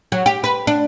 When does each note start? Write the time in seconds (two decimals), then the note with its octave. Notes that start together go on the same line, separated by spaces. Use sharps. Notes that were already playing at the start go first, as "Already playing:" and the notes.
0.12 F#3
0.26 G4
0.44 B4
0.67 D4